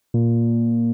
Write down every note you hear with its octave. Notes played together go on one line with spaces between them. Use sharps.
A#2